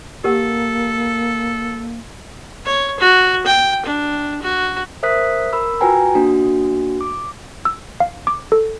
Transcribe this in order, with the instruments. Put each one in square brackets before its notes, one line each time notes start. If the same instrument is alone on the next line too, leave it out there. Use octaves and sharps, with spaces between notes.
[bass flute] A#3 [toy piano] G4 A#4 F#5 [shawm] A4
[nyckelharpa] C#5
F#4
G5
D4
F#4
[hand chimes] A#4 C5 E5 D#6 F#6 B6
A#4 B5 E6
F4 F#4 B4 G5 G#5 A#5
A#3 D4 F#4
D6
[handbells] E6
F5
D6
A4